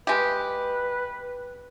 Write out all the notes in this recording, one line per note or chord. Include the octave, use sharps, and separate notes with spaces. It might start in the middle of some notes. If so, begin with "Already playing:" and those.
G#3 G4 B4